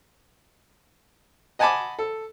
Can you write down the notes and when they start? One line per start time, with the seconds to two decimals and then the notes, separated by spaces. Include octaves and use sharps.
1.59 D#5 F#5 G#5 A5 B5 D6
1.99 A4